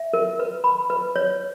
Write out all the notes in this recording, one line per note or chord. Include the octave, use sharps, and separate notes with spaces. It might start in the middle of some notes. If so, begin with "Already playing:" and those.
Already playing: E5
A#4
B4
B5
B4
C#5